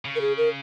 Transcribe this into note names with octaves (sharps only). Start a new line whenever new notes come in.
C#3
A#4
G#4
A#4